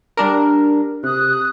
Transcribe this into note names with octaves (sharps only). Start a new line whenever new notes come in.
G3 D4 A#4
C3 D#6 F#6